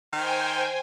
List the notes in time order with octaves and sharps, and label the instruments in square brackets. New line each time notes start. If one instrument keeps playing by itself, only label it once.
[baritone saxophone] D#3 [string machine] C5 G5 G#5